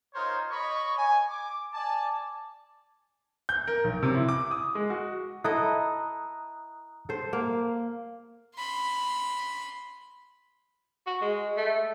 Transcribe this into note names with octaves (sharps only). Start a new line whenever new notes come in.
D#4 F4 A#4 C5 C#5
C#5 D#5 B5 C#6
G#5
D6
D5 G#5 A5
G6
A#4
B1
C3
E4
D6
D#6
G#3
F#4
E4 A4 D#5 A#5 D#6 F#6
A4 C5
A#3
B5 C6
F#4
G#3
A3